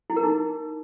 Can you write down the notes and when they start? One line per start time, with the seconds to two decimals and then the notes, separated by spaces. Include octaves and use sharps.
0.10 E4
0.17 A#4
0.23 D#4